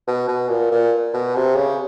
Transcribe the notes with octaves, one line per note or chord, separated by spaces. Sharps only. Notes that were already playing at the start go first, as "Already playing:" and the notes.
B2
B2
A#2
A#2
B2
C3
C#3